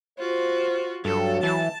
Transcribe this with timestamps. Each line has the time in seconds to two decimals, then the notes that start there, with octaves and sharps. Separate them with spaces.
0.19 F4 F#4 C5
1.05 G2 F#3 A4
1.43 E3 A5